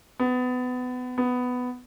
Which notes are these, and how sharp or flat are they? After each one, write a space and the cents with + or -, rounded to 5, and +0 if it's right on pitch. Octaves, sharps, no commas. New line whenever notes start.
B3 +25
B3 +10